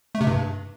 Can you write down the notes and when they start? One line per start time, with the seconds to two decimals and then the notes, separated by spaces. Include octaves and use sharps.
0.15 A3
0.21 C3
0.27 G2